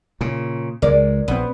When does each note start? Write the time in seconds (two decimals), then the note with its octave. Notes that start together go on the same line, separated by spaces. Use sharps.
0.21 A#2 C#3
0.82 C#2 G3 G#3 A#4 D5
1.28 A#1 B3 C4